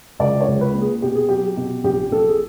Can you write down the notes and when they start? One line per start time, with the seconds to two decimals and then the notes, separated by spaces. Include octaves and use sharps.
0.19 C#2 D5
0.41 C#5
0.48 C#2
0.61 B4
0.74 A#3
0.81 G#4
1.02 B2 G4
1.15 G#4
1.29 F#3 G4
1.57 B2
1.84 A#1 G4
2.11 A#1 A4
2.29 G#4